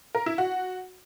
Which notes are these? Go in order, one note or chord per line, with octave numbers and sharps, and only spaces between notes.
A#4
E4
F#4